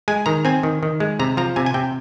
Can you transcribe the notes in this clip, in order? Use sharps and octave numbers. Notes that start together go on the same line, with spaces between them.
G#3 G#5
D#3 A#5
C4 G#5
D#3
D#3
G#3
C3 A#5
F3 A#5
C3 G#5
G#5
C3 G5